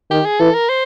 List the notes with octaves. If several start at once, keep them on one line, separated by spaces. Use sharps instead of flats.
D#3 G4
G#4
E3 A4
A#4
C5